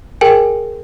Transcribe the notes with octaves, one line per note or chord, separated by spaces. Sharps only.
G#4 A#4 G5 G#5